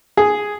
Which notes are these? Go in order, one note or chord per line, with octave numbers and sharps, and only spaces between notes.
G#4